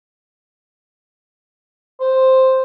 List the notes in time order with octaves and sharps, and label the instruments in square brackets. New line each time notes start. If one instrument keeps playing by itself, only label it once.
[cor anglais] C5